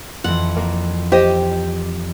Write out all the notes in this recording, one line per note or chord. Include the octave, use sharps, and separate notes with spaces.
F2 E3 F#5
A#3
G4 C5 D#5